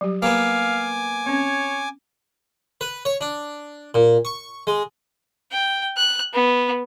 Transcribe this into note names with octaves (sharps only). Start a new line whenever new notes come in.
F#3 G3 G4
A#3 B3 F5 G#5 D6
C4 C#4 C#5
B4
C#5
D4
A#2
C#6
G#3
G5
F#6
B3